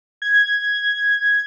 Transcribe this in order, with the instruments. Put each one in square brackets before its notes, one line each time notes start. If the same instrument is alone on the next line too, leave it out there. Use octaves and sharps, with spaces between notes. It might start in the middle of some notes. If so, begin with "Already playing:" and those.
[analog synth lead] G#6